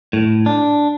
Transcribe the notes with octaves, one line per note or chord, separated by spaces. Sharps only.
A2
D4